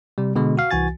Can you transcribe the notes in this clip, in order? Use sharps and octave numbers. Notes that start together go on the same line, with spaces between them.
C3 G3
B2 D3 G#3
F#4 F5
C2 E3 F#4 G#5 A6